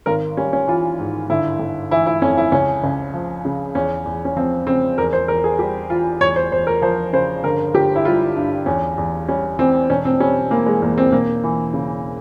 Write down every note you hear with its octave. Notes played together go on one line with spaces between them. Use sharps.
G#1 A#4
G3 C#4
C#4
E3 F4
G#2
G1 E4
G1
E3 E4
E4
F2 C#4
E4
C#2 C#4
C#2
F3
C#3
E2 C#4
E2
C#4
F3 C4
C#3 C4
E2 A#4
C5
E2 A#4
G#4
G3 G4
E3 F4
E2 C#5
C5
E2 C5
A#4
F3 C5
C#3 C5
G1 A#4
G1 G4
E4
G3 F4
G2
E2 C#4
E2
G3 C#4
E3 C4
E1 C#4
C4
G3 C#4
E3 A#3
G#3
E2 A#3
C4
E1 A#3
E3
C#3